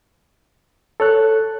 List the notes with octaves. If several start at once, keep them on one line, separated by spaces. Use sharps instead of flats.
A4 C#5 F#6